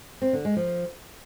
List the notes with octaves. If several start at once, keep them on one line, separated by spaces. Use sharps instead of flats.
C4
D3
G#3
F3